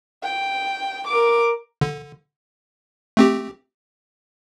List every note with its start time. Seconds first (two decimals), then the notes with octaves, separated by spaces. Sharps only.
0.23 G5
1.08 A#4 D6
1.81 D3
3.17 A3 C4 G4